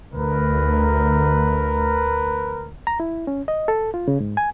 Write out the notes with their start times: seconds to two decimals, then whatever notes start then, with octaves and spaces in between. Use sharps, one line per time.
0.14 D2 A#4 B4
2.87 A#5
3.00 E4
3.27 C#4
3.48 D#5
3.68 A4
3.94 F4
4.08 C#3
4.20 G#2
4.37 G#5